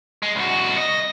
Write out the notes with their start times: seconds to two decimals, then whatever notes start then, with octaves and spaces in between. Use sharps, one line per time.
0.23 G#3
0.36 C2 F#4
0.78 D#5